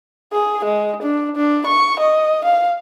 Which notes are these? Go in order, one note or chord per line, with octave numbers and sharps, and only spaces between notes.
G#4
G#3
D4
D4
C#6
D#5
F5